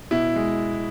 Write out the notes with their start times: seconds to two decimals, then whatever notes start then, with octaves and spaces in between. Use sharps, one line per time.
0.11 B2 E4
0.36 G#3